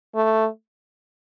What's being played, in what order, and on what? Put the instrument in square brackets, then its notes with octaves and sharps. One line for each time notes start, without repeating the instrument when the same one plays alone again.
[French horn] A3